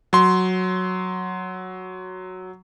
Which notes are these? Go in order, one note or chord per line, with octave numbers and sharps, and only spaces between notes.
F#3 C6